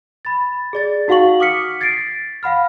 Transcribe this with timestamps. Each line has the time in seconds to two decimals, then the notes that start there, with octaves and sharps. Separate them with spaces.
0.25 B5 A6
0.73 G#4 D5 A6
1.08 D#4 F#4 F5 F#5 C#6 F#7
1.40 D6 D#6 F6 B6 C#7
1.81 G#6 A6 B6 C7 D7
2.43 F5 F#5 B5 F6